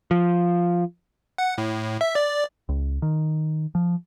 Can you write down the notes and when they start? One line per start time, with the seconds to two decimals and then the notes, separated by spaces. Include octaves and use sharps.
0.11 F3
1.38 F#5
1.58 A2
2.01 E5
2.15 D5
2.69 C#2
3.02 D#3
3.75 F3